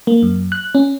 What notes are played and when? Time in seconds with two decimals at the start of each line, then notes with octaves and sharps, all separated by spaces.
0.07 A#3
0.22 F#2
0.52 F#6
0.75 C#4